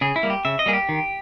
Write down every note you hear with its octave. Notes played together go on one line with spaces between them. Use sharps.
C#3 G#4
E4
G3 A#3
G4
C#3 E5
D#5
G3 A#3 G#4
G4
D#3